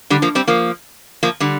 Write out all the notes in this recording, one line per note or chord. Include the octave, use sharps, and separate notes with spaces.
D3 G3
F3 A#3
G3 C4
F3 A#3
F3 A#3
D3 G3